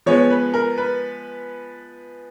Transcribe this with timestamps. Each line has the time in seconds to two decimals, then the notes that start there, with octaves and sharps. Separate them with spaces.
0.06 F3 G#3 B3 C#5
0.31 B4
0.54 A#4
0.78 B4